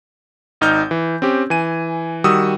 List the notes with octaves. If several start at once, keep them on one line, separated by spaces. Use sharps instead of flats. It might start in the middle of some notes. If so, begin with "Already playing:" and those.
G#1 D#4 F6 G6
E3
C4 C#4 G4
E3 G#5 D#7
D#3 G3 F#4 D#6 E6